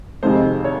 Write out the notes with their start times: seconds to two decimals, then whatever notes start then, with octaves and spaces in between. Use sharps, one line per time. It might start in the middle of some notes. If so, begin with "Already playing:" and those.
0.23 F2 C3 D#3 G#3 C4 C5
0.64 C#5